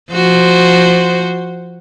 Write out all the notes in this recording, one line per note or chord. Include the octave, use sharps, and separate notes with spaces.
F3 F#4 C5